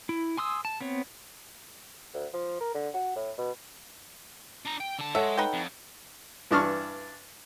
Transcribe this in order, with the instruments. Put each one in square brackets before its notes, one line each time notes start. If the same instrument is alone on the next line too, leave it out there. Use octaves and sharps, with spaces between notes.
[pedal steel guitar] E4
G#5 C6 D#6 E6
A5
B3 C4 C#5
[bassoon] D2
F3
A#4
D3
F#4
A2
B2
[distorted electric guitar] D4 A#5
G5
D3 A5
[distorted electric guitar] G#3 [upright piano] A4 C#5 F#5 [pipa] E5
[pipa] D#4 B4 G5
[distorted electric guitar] F2
[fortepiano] G2 E3 D4 A5 C#6 F6